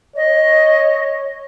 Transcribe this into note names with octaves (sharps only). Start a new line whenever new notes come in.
C#5 D#5